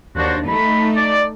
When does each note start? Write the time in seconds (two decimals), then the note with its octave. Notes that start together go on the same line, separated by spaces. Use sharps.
0.16 D#2 D4 F#4 C5
0.47 A3 D#4 B5
0.95 D5